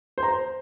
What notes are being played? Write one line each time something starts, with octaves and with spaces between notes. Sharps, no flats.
C5
A#5
C5